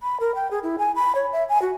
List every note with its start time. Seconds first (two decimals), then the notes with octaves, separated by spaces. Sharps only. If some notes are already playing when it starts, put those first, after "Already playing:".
0.02 B5
0.20 A#4
0.35 G5
0.51 G#4
0.63 E4
0.79 G#5
0.95 B5
1.15 C#5
1.32 E5
1.49 G#5
1.62 F#4